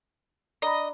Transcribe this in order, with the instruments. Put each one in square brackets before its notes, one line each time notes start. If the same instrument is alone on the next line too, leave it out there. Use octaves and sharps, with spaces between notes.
[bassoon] D4 [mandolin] D#5 [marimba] A#5 B5